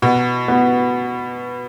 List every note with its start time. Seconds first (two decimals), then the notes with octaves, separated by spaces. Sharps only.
0.02 B2 F#4
0.48 B3